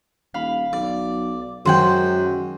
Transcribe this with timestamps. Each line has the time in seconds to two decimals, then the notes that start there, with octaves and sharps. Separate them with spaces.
0.34 D#1 F5 B5
0.73 B1 D5
1.65 F#2 D#3 G#3 C5 F#5 G5